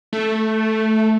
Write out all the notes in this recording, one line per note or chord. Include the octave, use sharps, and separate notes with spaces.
A3